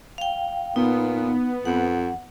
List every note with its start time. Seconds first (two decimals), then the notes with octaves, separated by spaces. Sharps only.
0.18 F5 G5
0.76 A#2 B3 D#4
1.65 F2 F#5